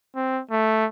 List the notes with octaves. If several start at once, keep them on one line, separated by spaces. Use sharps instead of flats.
C4
A3